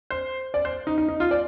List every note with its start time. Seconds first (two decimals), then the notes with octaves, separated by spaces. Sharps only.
0.10 C5
0.54 D5
0.65 C5
0.87 D#4
0.98 D#4
1.09 D#4
1.20 F4
1.31 D5